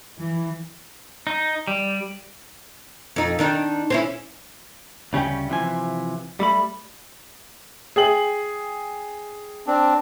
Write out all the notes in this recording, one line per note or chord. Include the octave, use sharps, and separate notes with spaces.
E3
D#4
G3
F2 D#4
D#3 D4 D#4
C4 C#4 E4
D2 C#3 G3 C#4 G5
D2 C3 E3 F3 G#5
G3 A3 B5
G#4 G5 F#7
C4 D4